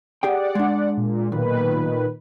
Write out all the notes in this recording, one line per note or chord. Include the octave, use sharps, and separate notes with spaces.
G4 G#4 D5 F#5 G5
G#3 D4
A#2
B1 A#2 D#3 B4